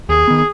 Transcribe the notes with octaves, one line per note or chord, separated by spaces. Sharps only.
D#2 G#4
D#3 B3